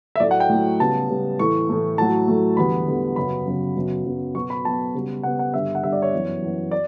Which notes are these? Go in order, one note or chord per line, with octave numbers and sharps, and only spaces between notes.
E5
A2 F#3 A3 D5
F#5
G5
A2 F#3 A3
C#3 G3 B3 A5
C#3 G3 B3
A2 E3 A3 C#6
A2 E3 A3
A2 F#3 A3 A5
A2 F#3 A3
E2 D3 G3 B3 B5
E2 D3 G3 B3
F#2 C#3 F#3 B3 B5
F#2 C#3 F#3 B3
F#2 C#3 F#3 B3
F#2 C#3 F#3 B3
B2 F#3 B3 C#6
B5
B2 F#3 B3 A5
C#3 G3 B3
C#3 G3 B3 F#5
F#5
G2 D3 G3 E5
F#5
G2 D3 G3 E5
D5
C#5
F#2 E3 B3
F#2 E3 B3
D5